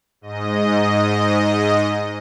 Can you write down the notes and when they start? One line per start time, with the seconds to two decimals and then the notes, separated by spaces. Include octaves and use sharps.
0.21 G#2 D#5